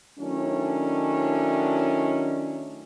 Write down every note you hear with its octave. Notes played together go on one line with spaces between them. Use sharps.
D#3 F#3 A3 C#4 D4 E4